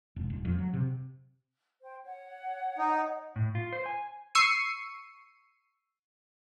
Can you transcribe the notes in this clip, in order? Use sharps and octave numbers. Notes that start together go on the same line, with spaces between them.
E1
D#1
F2
F#3
C3
C5 G5
C#5 F#5
D#4
A2
F4
C5
G#5
C#6 E6 C7 C#7 D#7